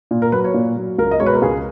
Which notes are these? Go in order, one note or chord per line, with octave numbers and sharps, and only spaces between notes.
A#2
A#4
F#3 B4
C#5
A#2
F#3
C#2 A#4
D#5
B2 G#3 C#5
B4
A#4
C#2 G#4